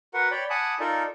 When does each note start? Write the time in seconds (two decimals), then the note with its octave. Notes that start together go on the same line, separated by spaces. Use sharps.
0.14 F#4 A#4 B4 F#5
0.31 C#5 D5 G5 B5
0.50 F#5 G#5 A5 B5 D6 D#6
0.80 D#4 F4 A4 A#4 D5